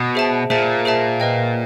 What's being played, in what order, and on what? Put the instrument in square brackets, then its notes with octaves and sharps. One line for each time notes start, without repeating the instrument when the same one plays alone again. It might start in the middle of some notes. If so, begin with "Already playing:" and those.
Already playing: [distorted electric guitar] B2
[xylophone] G#4 C5 E5 A5
[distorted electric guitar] A#2 [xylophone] G#4 C5 E5 A5
[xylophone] G#4 C5 E5 A5
B4 D#5 G5